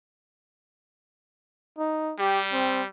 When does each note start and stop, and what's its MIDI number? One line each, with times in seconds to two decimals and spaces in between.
1.78 2.14 63
2.19 2.87 55
2.19 2.40 67
2.53 2.82 60